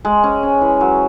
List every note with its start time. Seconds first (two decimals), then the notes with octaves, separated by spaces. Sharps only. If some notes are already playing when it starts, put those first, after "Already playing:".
0.05 G#3
0.23 C#4
0.43 C#4
0.61 E3
0.81 F#3